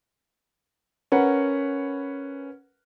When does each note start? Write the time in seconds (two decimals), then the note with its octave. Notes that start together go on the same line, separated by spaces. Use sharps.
1.12 C#4 A#4 B4 F#5